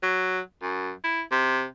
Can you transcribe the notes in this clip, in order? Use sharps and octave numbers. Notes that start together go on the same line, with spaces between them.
F#3
F#2
E4
C3